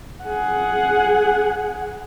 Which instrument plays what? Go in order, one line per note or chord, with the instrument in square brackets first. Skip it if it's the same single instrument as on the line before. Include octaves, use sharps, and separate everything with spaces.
[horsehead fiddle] G#4 F#5